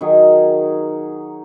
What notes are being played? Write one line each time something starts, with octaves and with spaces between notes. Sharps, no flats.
D#3 F#3 D#4 G#4